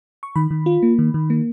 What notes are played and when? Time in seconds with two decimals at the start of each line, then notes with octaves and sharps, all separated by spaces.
0.23 C#6
0.36 D#3 B5
0.51 D#3
0.66 F4
0.83 A#3
0.99 D#3
1.14 D#3
1.30 A#3